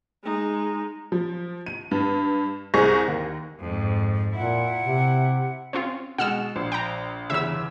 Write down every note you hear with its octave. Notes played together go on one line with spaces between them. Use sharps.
G#3 D#4
F3
D#7
G2
C2 G#4 C5 C#6 A#6
D#2
F2 G#2
A#2 E4 F#5
C3
C4 C#4 F4
B2 G#3 F#5 E6 F6
A#1
G5 A#5
G1 E2 C#3 E5 E6